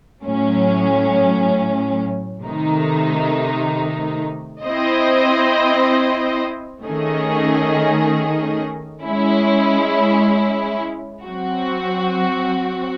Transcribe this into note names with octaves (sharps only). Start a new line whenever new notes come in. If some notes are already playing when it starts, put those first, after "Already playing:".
A2 F#3 C#4
C3 D#3 A3 D#4
C4 E4 C5 D#5
D#3 A3 C#4 G#4 D#5
G#3 C#4 E4
F#3 C4 F#4